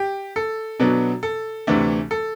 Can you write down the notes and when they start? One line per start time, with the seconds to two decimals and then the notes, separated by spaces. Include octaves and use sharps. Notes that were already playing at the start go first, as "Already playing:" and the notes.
Already playing: G4
0.36 A4
0.80 B2 F#3 B3 D4
1.23 A4
1.67 D2 C3 E3 A3 D4
2.11 A4